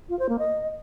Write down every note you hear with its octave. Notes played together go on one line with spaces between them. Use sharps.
F4
C5
A#3
D#5